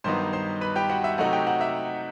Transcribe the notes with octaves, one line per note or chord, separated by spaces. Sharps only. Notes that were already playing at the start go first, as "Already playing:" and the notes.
G2 D#3 F#3 B3 D#4 C5 C6
C5 C6
B4 B5
G4 G5
F#4 F#5
E5
C3 F#3 A3 D#4 F#4 F#5
G4 G5
F#4 F#5
E5